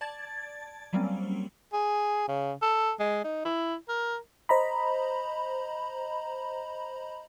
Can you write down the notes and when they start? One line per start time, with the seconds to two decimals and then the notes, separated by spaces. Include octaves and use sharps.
0.01 D5 A5 G#6 A6
0.93 F#3 G3 A#3 C4 C#4
1.73 G#4
2.28 C#3
2.62 A4
2.99 G#3
3.24 D#4
3.45 E4
3.89 A#4
4.49 C5 D#5 A#5 B5